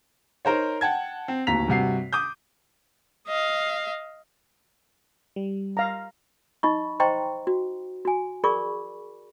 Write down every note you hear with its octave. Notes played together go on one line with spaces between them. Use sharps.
D#4 A#4 C5 C#5
F#5 G5 A5 G#6
C4
D1 D#2 A#5 B6 F7
G2 C3 F#4 C7
D6 D#6 G6
D#5 F5
G3
F5 A#5
D#4 D#5 B5 C#6
C5 D#5 G5 A#5 C6 C#6
F#4
F#4 G#5
G#4 A#4 D5 B5 C#6 D6